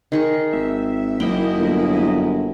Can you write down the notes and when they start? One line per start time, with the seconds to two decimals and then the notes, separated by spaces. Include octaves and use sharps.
0.12 D#3 G#4 C#6
0.53 G#1 E5
1.20 F#1 F#2 A#3 E4 D#5 G5
1.58 G1